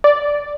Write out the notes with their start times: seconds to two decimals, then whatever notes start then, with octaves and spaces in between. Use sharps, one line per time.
0.04 D5